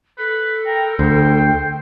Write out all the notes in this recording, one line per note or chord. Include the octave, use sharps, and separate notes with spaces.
A4 B4
A#4 G5
D2 C5